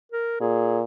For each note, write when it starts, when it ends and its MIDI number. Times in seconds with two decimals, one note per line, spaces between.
0.12 0.40 70
0.41 0.84 46
0.41 0.79 68